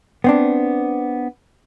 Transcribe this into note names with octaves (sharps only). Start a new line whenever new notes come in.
B3 C4 D4